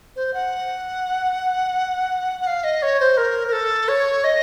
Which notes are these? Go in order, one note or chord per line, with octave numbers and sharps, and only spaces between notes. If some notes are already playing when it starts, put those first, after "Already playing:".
C5
F#5
F#5
F5
D#5
C#5
C5
A#4
A#4
A4
C#5
D#5